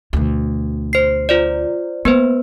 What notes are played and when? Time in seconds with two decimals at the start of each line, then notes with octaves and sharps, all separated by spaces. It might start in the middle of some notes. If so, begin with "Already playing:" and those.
0.13 D2 B2
0.93 C5 C7
1.29 F4 C5 D5
2.05 A#3 B3 B4 C5